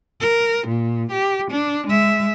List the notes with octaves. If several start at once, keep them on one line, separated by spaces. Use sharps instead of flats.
A#4
A#2
G4
D4
G#3 E5